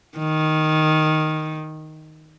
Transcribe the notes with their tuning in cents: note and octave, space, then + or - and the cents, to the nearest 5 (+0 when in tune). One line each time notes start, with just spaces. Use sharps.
D#3 +0